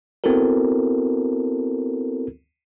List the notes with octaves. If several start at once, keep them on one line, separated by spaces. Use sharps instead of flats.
B3 C4 E4 F#4 A4 A#4